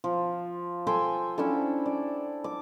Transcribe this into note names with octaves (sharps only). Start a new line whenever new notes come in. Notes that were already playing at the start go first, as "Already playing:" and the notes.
F3
A4 G5 G#5 C6
C#4 D4 E4 A4
D5
D6